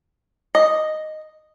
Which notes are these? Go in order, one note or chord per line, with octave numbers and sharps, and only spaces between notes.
D#5